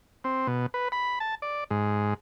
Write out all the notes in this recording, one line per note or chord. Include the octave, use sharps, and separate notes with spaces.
C4
B2
B4
B5
A5
D5
G#2